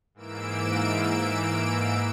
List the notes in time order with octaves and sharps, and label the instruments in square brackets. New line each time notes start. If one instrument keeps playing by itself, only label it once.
[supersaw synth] G#2 E3 A#3 E6 D7